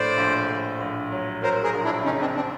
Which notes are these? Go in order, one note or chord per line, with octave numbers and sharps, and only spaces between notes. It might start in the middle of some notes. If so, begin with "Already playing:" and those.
Already playing: A#1 A2 C5 D5
A#1
A#1
A#1
F#3
F#3 A#4 C5
G#4 A#4
A#1
D4 E4
C#3 C#4 D#4
C4 D4
C4 D4